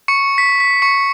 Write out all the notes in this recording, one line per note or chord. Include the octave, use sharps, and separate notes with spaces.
C#6 C#7
B6
B6
C#6 C#7